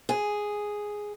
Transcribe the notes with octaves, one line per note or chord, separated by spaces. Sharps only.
G#4